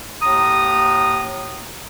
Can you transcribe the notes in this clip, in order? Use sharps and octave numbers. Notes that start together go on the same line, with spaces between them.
D#2 A2 A#5 D#6